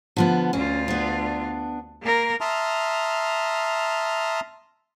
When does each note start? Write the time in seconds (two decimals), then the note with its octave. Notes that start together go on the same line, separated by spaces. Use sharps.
0.17 D3 F3 B3
0.53 D2 C#4 F4
0.88 B3 D4
2.02 A#3 A#4
2.41 E5 A5 A#5 C6 D#6 F6